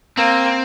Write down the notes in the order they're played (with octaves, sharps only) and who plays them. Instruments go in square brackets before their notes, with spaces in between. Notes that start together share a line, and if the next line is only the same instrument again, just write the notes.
[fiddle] A#3 [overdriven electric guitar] C4